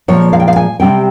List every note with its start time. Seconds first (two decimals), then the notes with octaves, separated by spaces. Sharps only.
0.08 A#2 F3 G#3 C#5
0.33 F5
0.40 G5
0.48 F5
0.56 G#5
0.80 C3 G3 C4 G5